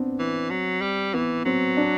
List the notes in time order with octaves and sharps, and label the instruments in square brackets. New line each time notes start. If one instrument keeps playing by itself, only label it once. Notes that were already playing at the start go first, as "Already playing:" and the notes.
Already playing: [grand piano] B3 C4 D4
[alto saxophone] E3
F#3
G3
[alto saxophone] E3 [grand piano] B3
[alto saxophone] F#3 [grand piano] C4
[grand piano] D4